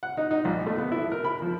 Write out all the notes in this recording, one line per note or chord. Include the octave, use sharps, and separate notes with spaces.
F#5
D#4
D#4
A#1
A3
B3
E4
A#4
B5
F3